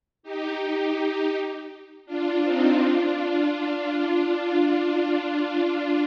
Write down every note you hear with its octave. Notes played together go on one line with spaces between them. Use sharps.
D#4 G4
D4 F4
C4 D#4
D4 F4